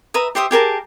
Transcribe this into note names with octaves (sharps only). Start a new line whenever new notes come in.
B4 E5 A#5 D#6
G4 C5 E5 D#6
G4 G#4 A#4 A5